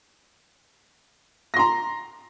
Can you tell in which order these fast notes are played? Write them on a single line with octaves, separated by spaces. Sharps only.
A#6 C6 A#5